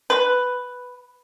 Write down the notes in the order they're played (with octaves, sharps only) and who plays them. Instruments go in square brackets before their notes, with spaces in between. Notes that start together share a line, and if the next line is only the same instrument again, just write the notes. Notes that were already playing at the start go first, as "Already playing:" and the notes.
[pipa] B4